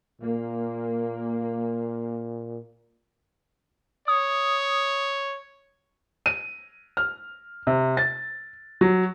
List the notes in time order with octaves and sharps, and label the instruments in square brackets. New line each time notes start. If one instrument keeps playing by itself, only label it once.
[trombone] A#2 [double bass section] A#3
[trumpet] C#5 [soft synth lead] D#6
[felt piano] D#7
F6
C3
A6
F#3